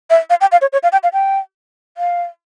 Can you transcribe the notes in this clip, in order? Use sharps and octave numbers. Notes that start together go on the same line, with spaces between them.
E5
F5
G5
F5
C#5
C#5
F5
G5
F5
G5
F5